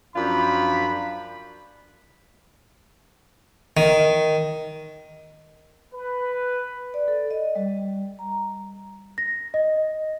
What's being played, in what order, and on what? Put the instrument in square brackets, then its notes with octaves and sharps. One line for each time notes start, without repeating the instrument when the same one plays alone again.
[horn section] F#2 F3 D4 F4 B5
[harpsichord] D#3
[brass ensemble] B4
[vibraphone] D5
A4
D#5
G3
A#5
[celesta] A#6
D#5